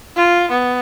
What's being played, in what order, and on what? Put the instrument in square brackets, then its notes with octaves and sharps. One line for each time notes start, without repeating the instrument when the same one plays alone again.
[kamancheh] F4
B3